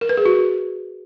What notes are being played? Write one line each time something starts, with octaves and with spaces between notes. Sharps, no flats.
A#4
B4
G#4
F#4